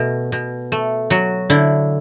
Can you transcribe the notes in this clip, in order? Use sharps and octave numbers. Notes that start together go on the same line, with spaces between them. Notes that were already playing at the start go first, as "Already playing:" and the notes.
Already playing: B2 A3
B2
A3
F#3 F#4
D3 E4